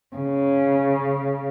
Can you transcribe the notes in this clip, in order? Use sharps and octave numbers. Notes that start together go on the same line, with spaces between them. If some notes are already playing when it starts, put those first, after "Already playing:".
C#3